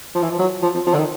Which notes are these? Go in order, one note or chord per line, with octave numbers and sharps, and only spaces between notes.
F3
E3
F3
F#3
F3
F3
F3
D3
D#3